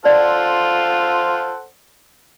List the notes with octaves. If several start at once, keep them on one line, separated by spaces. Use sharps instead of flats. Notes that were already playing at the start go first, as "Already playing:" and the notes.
F4 A4 C5 D5 F#5